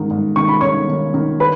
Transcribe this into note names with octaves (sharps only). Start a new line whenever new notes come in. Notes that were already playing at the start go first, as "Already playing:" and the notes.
Already playing: G#2 D#3
G#2
D#3 C#6
B5
D#3 C#5 C#6
D#3
D#3
B4 B5